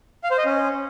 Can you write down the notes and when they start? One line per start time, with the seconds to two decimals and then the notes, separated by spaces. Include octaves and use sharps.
0.24 F5
0.31 C5
0.38 D#5
0.45 C#4